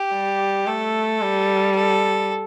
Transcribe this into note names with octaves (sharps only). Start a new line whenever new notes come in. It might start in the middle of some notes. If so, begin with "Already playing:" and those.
Already playing: G4
G3
A3 A4
G3
A4